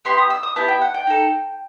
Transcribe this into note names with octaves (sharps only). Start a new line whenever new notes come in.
B3 E4 G4 C6
D#6
E6
D#6
B3 E4 G4 A5
G5
F#5
G5
D#4 A4